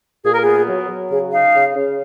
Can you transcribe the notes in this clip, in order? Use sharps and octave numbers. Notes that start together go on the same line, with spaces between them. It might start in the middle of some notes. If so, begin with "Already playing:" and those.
A#2 G#4
A#4
B3 G#4
F#3
F#3
C#3 G#4
D#4 F5
C#3
C#3